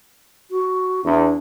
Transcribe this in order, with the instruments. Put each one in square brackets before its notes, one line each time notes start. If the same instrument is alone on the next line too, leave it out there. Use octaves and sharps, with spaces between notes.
[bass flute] F#4
[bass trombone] E2 [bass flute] D4